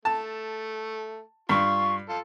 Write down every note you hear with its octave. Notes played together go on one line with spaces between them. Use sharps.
A3 A5
G2 F4 C#6
F4 A4